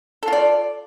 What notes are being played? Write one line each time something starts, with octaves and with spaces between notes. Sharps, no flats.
F4 A4 D5